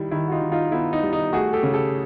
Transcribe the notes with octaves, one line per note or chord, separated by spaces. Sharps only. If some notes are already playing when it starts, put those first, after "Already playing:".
Already playing: D#3 G3 E4
D#3 E4
F#4
D#4 F4
D#3
D#4 F4
B3 E4
D#4
G3
D#4
A3 F#4 G#4
G4 A4
C#3
G4 A4